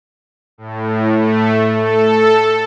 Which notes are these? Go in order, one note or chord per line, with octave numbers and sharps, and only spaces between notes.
A2
A3
A4